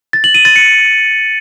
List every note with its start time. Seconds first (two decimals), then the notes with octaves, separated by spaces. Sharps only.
0.13 A6
0.24 F#7
0.34 D#7
0.45 A6
0.56 C#7